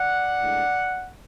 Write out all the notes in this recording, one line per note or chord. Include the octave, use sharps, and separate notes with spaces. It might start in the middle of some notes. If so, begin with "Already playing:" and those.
Already playing: D5 F#5
A2 G#3 D4